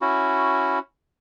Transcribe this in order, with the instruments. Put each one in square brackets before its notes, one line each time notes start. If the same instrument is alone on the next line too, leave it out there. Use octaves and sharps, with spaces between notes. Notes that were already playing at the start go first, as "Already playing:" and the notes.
[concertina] C#4 E4 F#4